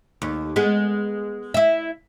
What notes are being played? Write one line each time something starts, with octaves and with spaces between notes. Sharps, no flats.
D#2
G#3 B3
E4 E5